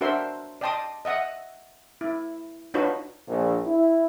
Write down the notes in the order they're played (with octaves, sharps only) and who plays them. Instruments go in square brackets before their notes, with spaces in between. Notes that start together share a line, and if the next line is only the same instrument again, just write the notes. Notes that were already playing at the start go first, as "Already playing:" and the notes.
[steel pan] D4 F#4 A#4 C5 E5 C6
D5 D#5 G5 A5 C6 D#6
D#5 E5 F#5 D#6
E4
D4 D#4 F4 F#4 B4 C#5
[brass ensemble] A#1
E4